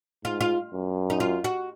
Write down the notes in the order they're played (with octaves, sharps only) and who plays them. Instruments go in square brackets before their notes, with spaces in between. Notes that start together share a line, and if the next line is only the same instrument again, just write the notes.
[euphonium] G#2 [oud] F4
[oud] F4
[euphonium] F#2
[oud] D#4
F4
F#4